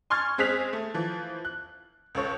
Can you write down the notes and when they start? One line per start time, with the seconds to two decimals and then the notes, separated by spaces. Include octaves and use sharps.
0.10 G#5 C6 C#6 F6 G#6 A6
0.38 G#3 C4 G#4 F#6 B6 F7
0.73 A3
0.94 E3 F3
1.45 F#6
2.15 C#2 A4 C#5